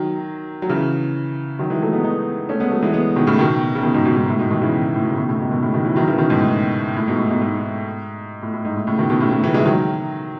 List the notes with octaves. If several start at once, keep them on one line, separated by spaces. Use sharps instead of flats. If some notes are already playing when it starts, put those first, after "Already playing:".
Already playing: D#3 F#3
F#3
C#3 E3
D#3 F#3
E3 G#3
F#3 A3
G#3 B3
B3 D#4
A3 C#4
G#3 B3
F#3 A3
E3 G#3
G#3 B3
B2 D#3
A2 C#3
B2 D#3
C#3
B2 D#3
G#2 B2
G#2 B2
G#2
A2
G#2 B2
B2 D#3
C#3 E3
A2
B2
C#3
B2 D#3
A2 C#3
G#2 B2
B2 D#3
A2 C#3
B2 D#3
C#3 E3
D#3 F#3
C#3 E3
B2 D#3
G#2 B2
A2
A2
G#2 B2
A2
G#2 B2
G#2
A2
A2
G#2
A2
A2 C#3
B2 D#3
B2 D#3
A2 C#3
A2 C#3
C#3 E3
E3 G#3
D#3 F#3